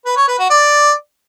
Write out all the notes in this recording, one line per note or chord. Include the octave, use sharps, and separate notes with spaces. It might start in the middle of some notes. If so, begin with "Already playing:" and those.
B4
C#5
B4
F#4
D5